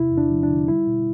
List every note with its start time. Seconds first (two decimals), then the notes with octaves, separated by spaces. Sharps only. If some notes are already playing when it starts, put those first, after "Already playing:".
Already playing: E2 C3 E4
0.11 E2
0.18 D4
0.31 F3
0.43 D4
0.50 D3
0.68 G3 E4
0.87 B2